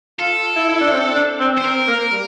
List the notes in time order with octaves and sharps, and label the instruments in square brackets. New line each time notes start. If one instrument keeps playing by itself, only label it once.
[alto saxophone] F4 [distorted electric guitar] A4
[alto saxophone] E4
E4
D4
C4
D4
C4
[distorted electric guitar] C5
[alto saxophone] C4 [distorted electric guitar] A#4
[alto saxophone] A#3
G3